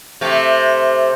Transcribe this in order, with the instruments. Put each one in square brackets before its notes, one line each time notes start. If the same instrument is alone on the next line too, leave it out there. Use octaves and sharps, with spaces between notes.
[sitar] C3 A3